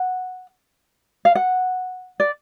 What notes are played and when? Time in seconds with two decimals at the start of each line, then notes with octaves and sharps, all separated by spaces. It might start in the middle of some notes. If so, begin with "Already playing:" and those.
Already playing: F#5
1.25 F5
1.35 F#5
2.20 D5